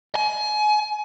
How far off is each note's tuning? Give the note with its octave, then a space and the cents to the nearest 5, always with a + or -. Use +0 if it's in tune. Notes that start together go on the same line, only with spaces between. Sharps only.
G#5 +30